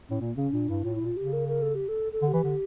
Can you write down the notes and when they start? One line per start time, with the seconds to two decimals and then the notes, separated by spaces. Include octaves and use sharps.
0.09 A2 C#4
0.20 A#2 A#3
0.36 C#3 C#4
0.52 A#2 D4
0.68 G2 E4
0.84 A2 F4
0.95 E4
1.00 A#2 F4
1.16 C#3 G4
1.33 A#4
1.48 A#4
1.62 A4
1.75 G4
1.88 A4
2.12 A4
2.22 D3
2.28 G4
2.33 E3
2.44 D3